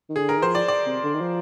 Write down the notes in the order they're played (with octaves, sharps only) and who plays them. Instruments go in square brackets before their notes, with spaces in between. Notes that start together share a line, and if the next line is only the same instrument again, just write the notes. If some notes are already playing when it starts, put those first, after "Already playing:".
[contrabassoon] D#3
[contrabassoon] D3 [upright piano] G#4
[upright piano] A#4
[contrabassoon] D#3
[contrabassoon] F3 [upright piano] C5
[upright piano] D5
D5
[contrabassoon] C3
D3
D#3
F3